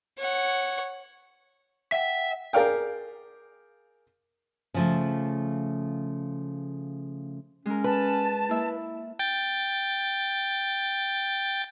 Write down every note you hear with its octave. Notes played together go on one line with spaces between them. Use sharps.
C#5 F#5
E5 F#5 G5
G#4 A#4 D5 F5 G5
C#3 F3 A3
G#3 C#4 A#4
B4 A5
A#3 E4 E5
G5 A6